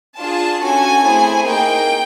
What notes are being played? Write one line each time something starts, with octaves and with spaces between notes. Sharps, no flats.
D4 F4 G#4 A5
C#4 F#4 A4 G#5
A3 C4 E4 G#4
A#3 D#4 G#4 G5